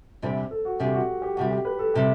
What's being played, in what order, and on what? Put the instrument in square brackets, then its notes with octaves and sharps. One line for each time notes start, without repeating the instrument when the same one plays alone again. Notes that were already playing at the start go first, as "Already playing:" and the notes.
[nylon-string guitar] E2 C3 G3 D4 [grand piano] C5
[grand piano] A4
F#4
[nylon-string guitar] E2 C3 G3 D4 [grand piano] G4
[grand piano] F#4
G4
[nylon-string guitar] D2 C3 G3 [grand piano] F#4
[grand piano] G4
B4
A4
[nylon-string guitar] C3 G3 [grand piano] G4